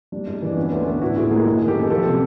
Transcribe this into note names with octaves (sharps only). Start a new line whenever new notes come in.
G3 D4
G#2
E3 D4
B3 C#4
D2 D4
B3 D4
A2 E4 F#4
A2 F#4 G#4
G#3 G#4 A#4
G#3
D#3
G4 A4
F#2
F3 G4 A4
C3